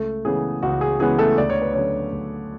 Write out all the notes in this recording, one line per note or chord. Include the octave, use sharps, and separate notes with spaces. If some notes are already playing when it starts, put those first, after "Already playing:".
Already playing: C#2 A3 A4
C#3 E3 G#3 B3 G#4
C#2 F#4
G#4
C#3 E3 G#3 B3 G#4
A3 A4
D2 D5
C#5
B4
D3 F#3 A3 C#4 C#5
D2